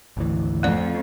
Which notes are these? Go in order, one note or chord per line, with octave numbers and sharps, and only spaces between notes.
G#1 D2 E3
F2 A3 D5